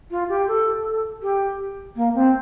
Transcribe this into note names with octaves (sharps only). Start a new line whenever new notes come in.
F4
G4
A4
G4
A#3
C4